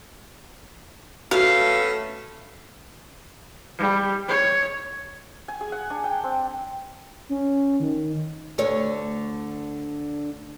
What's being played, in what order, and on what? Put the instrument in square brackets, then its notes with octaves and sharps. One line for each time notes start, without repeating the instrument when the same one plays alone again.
[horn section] A3 B3 C#4 [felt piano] F#4 [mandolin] F5
[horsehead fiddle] G3
C#5
[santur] G#5
G#4
F#5
D4
G5
C4
[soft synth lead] C#4
D#3
[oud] D2 D3 C#5